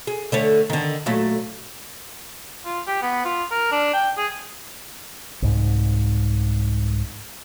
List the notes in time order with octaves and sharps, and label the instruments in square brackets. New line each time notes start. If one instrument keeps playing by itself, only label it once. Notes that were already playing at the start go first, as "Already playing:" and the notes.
[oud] G#4
D3 A3 C#5
D3 D#3
A#2 F#3 A3
[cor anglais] F4
G4
B3
F4
A#4
D4
G5
G#4
[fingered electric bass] C2 G#2